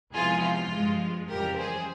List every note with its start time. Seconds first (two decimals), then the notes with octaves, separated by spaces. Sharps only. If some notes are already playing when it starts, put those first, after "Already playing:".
0.13 E2 C3 F3 G#3 F4 G#4
0.42 F4
0.71 G2 F3 G#3
1.28 F2 C#3 E3 G3 G4 A#4
1.57 G#4 C5